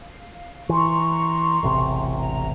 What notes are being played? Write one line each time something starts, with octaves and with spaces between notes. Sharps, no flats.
F5
E3 A#5 C6 C#6
E1 A1 C3
A#5